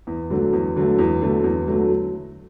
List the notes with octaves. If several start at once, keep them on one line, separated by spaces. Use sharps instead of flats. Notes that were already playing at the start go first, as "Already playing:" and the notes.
E2
D3 F#3 A3
E2
D3 F#3 A3
E2
D3 F#3 A3
E2
D3 F#3 A3